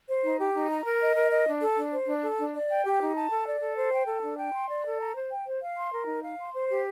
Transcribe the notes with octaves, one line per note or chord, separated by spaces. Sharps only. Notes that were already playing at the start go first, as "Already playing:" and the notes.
C5
D#4
G4
D#4
A#5
A#4
D#5
A#4
D#5
D4
A4
D4
C5
D4
A4
D4
D5
G5
G4
D#4
A5
A4
D5
A4
C5
G5
A4
D4
G5
C6
D5
A4
A#5
C5
G5
C5
F5
C6
A#4
D#4
F5
C6
C5
G4